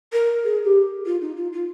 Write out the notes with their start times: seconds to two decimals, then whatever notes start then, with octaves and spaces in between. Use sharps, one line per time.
0.13 A#4
0.44 G#4
0.65 G4
1.06 F4
1.21 D#4
1.37 F4
1.53 F4